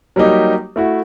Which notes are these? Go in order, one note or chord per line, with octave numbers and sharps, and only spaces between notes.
F#3 G3 A#3 D#4 G4
A3 E4 F#4